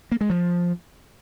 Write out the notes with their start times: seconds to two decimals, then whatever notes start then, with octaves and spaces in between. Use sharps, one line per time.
0.12 A#3
0.21 G#3
0.30 F3